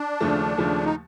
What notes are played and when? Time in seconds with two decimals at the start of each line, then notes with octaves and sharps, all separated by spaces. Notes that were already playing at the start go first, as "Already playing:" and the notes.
Already playing: D4
0.20 D#2 C#3 F3 A3
0.57 D#2 C#3 F3 A3
0.84 D#4